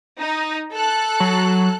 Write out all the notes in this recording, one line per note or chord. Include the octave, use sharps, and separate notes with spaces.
D#4
A4 F#6
F#3